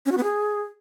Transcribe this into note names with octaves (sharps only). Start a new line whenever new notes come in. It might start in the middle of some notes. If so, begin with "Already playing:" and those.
C#4
F#4
B3
G#4